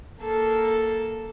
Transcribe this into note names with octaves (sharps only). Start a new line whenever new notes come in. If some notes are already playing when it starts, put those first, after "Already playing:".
A#3 A4